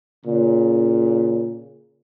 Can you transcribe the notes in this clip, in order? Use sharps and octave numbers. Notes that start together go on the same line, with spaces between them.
A#2 C#3